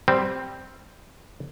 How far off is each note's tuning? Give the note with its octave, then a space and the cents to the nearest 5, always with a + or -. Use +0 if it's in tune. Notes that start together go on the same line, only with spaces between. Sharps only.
G3 +0 C4 +0